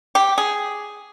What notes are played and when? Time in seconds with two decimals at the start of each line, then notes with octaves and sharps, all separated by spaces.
0.15 G4
0.38 G#4